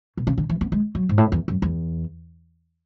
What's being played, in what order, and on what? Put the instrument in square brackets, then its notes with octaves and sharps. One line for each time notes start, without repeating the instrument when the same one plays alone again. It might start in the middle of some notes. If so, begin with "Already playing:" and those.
[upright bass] B2
C#3
D3
E3
B3
G#3
F#3
G#2
A2
E2
F#2
E2